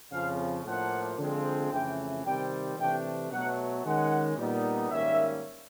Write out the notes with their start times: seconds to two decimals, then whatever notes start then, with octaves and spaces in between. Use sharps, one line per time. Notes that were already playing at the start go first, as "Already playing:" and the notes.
0.12 F2 C#3 F3 F5
0.65 A2 F3 A#3 D4 F#5
1.18 D3 F3 G#3 C4
1.72 F2 C#3 E3 A3 G5
2.25 C3 D#3 G3 C4 G5
2.78 C3 E3 A3 D4 G5
3.31 B2 F#3 A3 F#5
3.85 D#3 G#3 C#4 F#5
4.38 A#2 G3 B3 D#4
4.92 G#2 D#3 G3 A#3 C#4 E5